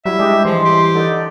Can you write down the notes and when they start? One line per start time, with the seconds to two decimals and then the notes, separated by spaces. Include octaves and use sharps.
0.05 F#3 G3 E4 E5
0.19 G#3 D4 G4 D#5
0.45 G#2 E3 F3 C6
0.65 G4
0.95 D3 D#4 D5